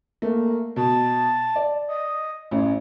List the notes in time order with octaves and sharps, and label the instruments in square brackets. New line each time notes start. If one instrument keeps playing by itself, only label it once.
[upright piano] A3 [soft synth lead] A#3
[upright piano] B2 [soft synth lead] A5
[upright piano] D5
[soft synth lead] D#5
[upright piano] A1 [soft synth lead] C#4